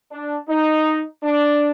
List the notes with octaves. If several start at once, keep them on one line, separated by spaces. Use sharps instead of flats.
D4
D#4
D4